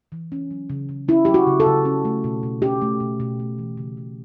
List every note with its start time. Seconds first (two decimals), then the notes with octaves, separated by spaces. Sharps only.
0.12 E3
0.32 C#4
0.51 F#3
0.70 C#3
0.89 C#3
1.08 C#4 E4
1.25 F#3 G4
1.34 F#4
1.47 C#3
1.60 A4
1.66 C#3
1.85 C#4
2.05 A3
2.24 B2
2.43 B2
2.62 C#4 G4
2.81 A3
3.00 B2
3.20 B2
3.40 A3
3.58 E3
3.77 C#3
3.97 C#3